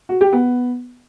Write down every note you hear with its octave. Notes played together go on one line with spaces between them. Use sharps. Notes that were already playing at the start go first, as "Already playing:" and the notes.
F#4
G4
B3